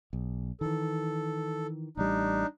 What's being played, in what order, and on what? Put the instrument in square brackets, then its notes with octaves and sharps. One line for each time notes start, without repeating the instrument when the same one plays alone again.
[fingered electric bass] B1
[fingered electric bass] D#3 E3 [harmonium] A4
[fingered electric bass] A1 G3 [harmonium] D4 D#4